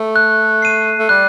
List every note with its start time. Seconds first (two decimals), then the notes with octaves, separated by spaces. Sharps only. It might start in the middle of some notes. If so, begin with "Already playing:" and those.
Already playing: A3
0.16 F#6
0.62 C7 D#7
0.99 A3
1.09 G3 F#6